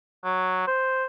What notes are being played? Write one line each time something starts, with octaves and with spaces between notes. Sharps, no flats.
F#3
C5